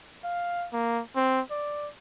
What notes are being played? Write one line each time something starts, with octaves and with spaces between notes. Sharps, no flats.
F5
A#3
C4
D5